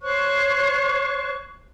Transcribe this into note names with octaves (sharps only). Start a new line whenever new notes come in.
C5 C#5 C#6 F#6